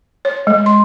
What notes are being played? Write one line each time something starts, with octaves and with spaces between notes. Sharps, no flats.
C#5
G#3
C6